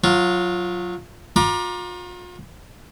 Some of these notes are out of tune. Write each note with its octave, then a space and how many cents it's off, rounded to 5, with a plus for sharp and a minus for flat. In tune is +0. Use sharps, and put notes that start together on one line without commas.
F#3 -20 F4 +0
F4 +40 A#5 +30 D6 +20